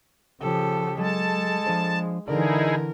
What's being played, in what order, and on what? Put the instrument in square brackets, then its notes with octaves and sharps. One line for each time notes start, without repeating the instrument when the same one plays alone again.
[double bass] C#3 F3 [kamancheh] G4 A4
[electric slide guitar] F#3 [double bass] G#3 [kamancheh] A4 [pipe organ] A5
[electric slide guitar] F3 D4 C5
[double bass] D3 E3 [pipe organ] D#4 E4 G#4 [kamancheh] A#4 [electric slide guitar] D5